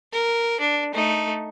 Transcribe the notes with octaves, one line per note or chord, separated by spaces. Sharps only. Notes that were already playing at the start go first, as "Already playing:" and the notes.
A#4
D4
A3 D#4